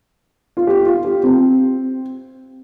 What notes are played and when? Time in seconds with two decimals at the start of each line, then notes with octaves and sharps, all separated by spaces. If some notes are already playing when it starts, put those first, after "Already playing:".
0.57 F4
0.67 G4
0.86 F4
1.05 G4
1.23 C4